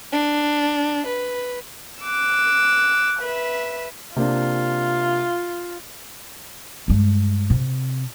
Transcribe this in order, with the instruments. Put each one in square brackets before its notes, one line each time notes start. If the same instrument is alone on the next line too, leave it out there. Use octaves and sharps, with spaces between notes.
[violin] D4
B4
[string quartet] D6 E6 [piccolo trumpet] F#6
[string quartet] B4 E5
[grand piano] C3 A#3 D4 [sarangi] F4
[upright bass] G2 G#3
C3